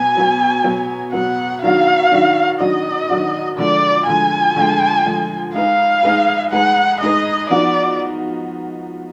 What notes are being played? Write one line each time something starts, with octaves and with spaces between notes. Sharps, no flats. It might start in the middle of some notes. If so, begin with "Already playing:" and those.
Already playing: B2 F#3 B3 G#5
B2 F#3 B3
B2 F#3 B3
B2 F#3 B3 F#5
D#3 F#3 D4 F#4 F5
D#3 F#3 D4 F#4
D#3 F#3 D4 F#4 D#5
D#3 F#3 D4 F#4
D3 F3 G#3 D5
D3 F3 G#3 G#5
D3 F3 G#3
D3 F3 G#3
G#3 D#4 G#4 B4 F5
G#3 D#4 G#4 B4
G#3 D#4 G#4 B4 F#5
G#3 D#4 G#4 B4 D#5
F3 B3 D#4 F#4 D5